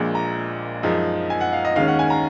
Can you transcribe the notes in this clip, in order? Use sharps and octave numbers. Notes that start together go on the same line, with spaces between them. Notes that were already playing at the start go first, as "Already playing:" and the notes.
Already playing: A#1 A#2 G#3
A#5
F#2 F3 G#3 D#4
G#5
F#5
F5
D#5
D#2 D#3 G#3 C#4 F5
F#5
G#5
A#5